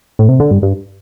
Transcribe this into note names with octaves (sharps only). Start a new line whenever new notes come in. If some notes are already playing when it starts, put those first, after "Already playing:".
A2
C3
D3
G2
G2